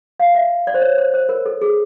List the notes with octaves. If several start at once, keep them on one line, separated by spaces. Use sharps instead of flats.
F5
E5
D5
C5
C#5
C5
C5
A#4
A4
G#4